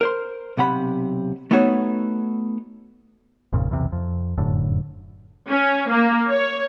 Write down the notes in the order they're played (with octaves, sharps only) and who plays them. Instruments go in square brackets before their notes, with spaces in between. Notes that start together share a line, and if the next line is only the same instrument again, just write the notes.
[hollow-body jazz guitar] A#4 C5 C6
B1 C3 F#5 B5
A3 B3 D#4 F#4 C#5
[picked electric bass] G#1 F2 A#2 C#3
B1 E2 C3
F2
F1 F#2 A2 D3
[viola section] C#4
A#3
C#5